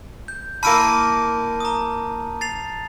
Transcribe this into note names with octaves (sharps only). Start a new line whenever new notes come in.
G6
A#3 E4 A5 B5 F6 D#7
A#5 D#6
A6 C7 F7